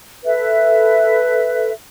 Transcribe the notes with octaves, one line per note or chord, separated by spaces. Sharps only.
A4 B4 E5